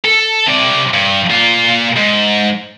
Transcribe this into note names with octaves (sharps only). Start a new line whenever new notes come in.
A4
C3 D5
G2
A#2 F4
G#2